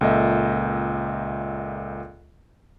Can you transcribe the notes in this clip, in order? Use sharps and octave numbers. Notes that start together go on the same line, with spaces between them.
C#2 A#2 A4 D#5 E5